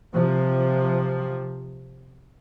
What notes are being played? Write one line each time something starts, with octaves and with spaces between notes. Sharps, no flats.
C3 F3